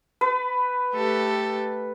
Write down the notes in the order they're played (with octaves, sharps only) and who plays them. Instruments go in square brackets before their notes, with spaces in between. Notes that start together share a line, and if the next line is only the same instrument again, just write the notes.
[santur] B4
[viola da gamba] A3 G4 A4